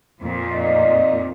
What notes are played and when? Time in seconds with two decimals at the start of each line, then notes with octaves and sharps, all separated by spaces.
0.22 F2 A#2
0.53 D#4 D5 D#5